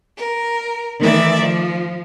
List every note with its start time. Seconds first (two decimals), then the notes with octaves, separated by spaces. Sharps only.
0.17 A#4
1.00 D#3 E3 A3 D5 E5 A6
1.39 F3